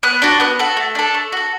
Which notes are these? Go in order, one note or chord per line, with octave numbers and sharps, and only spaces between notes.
B3 F#6
D4 F#4
B3 F#6
F#4 A4
A3
D4 A4
A3
F#4 A4